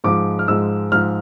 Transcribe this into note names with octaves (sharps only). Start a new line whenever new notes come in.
G#2 F3 G#3 D6
F6
G#2 F3 G#3 E6
G#2 F3 G#3 F6